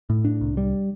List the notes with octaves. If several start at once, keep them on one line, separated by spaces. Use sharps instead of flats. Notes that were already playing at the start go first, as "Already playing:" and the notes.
A2
D4
C2
G3